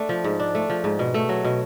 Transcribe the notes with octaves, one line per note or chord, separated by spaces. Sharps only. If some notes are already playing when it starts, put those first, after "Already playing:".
Already playing: A3 D4
F3
G#2
D4
A3
F3
G#2
B2
A3
F#3
B2